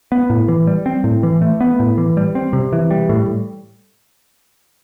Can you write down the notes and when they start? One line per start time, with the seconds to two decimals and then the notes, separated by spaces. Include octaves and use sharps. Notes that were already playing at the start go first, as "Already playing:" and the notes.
0.12 B3
0.30 A2
0.48 E3
0.67 G3
0.86 C4
1.04 A2
1.23 E3
1.42 A3
1.61 B3
1.80 A2
1.98 E3
2.17 G3
2.35 C4
2.53 C3
2.73 E3
2.91 G3
3.09 A2